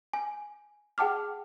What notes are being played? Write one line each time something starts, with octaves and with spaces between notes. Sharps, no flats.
G#5
G#4 F#5 G5 A5 D6 F6